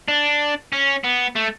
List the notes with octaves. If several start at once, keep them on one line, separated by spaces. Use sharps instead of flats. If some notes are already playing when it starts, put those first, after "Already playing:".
D4
C#4
B3
A3